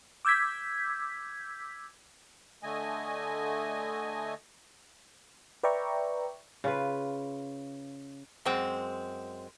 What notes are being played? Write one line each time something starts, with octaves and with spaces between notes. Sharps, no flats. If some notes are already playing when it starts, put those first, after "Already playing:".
D6 E6 G6 G#6 B6
D3 A3 D#5 G#5
B4 D5 E5 G5 A#5 C#6
C#3 F4 B4
F#2 G#3 C4